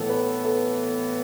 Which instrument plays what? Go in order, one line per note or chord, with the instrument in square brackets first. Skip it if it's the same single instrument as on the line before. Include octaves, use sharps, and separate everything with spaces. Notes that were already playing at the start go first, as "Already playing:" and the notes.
Already playing: [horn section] A2 E3 B3 [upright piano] A4
[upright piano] B4
A4